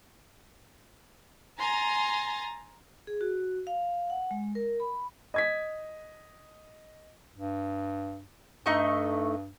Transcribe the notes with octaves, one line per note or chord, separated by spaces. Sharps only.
G#5 A#5 C6 A6
G#4
F#4
F5
F#5
G#3
A#4
B5
D#5 G#6 B6
G2
G2 A3 D#4 C#6